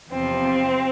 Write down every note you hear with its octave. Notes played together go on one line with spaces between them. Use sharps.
E2 C3 F3 C4